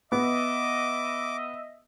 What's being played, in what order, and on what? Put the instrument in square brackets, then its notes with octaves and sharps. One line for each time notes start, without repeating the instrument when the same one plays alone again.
[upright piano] B3 [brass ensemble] D#5 E5 [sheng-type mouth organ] D6